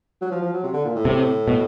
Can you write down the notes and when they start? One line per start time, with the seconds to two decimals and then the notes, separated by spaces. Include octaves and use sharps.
0.21 F#3
0.32 F3
0.42 F3
0.53 F#3
0.63 C3
0.73 D3
0.85 A#2
0.95 A2
1.05 C3
1.48 B2